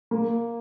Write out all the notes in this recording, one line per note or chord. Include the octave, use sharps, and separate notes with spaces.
A#3